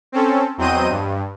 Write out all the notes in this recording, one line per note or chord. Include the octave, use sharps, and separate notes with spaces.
C4 C#4 A4
E2 F#3 C4 D#5 G6 D#7
G2